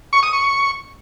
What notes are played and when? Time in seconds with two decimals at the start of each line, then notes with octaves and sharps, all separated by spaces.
0.13 C#6
0.23 D#6
0.33 C#6